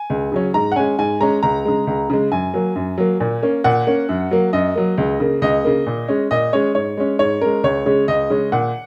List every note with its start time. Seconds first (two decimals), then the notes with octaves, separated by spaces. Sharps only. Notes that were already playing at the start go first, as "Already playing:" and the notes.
Already playing: G#5
0.10 C#2
0.32 C#3 F#3 C#4
0.54 G#2 A#5
0.72 F#5
0.76 G#3 C#4 G#5
0.99 G#2 G#5
1.21 G#3 C#4 A#5
1.43 C#2 A#5
1.65 C#3 G#3
1.87 C#2
2.10 C#3 G#3
2.31 F#2 G#5
2.54 F#3 A#3
2.75 F#2
2.98 F#3 A#3
3.20 A#2
3.43 A#3 C#4
3.64 A#2 F#5
3.87 A#3 C#4
4.09 F#2
4.31 F#3 A#3
4.53 F#2 D#5
4.75 F#3 A#3
4.98 C#2
5.20 C#3 A#3
5.42 C#2 D#5
5.64 C#3 A#3
5.87 A#2
6.08 G#3 C#4
6.31 A#2 D#5
6.53 G#3 C#4 C#5
6.75 G#2 C#5
6.97 G#3 C#4
7.19 G#2 C#5
7.41 G#3 C#4 A#4
7.63 C#2 C#5
7.86 C#3 G#3 C#4
8.08 C#2 D#5
8.30 C#3 G#3 C#4
8.52 A#2 F#5